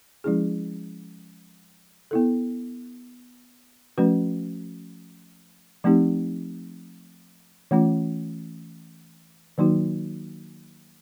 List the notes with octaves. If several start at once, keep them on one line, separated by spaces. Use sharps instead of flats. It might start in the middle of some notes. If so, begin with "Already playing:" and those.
F3 G#3 C#4 E4 G#4
B3 E4 A4
F3 A3 C#4 F#4 B4
F3 A3 C4 D#4 G4
E3 A3 C#4 F4
D#3 F#3 A#3 D#4 F#4